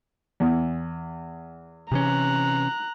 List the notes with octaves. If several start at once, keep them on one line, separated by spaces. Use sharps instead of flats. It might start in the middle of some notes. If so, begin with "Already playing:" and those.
E2
C3 E3 C#4 A#5 F#6